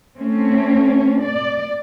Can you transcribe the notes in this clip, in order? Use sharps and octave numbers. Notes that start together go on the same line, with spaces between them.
A3 C4 C#4
D5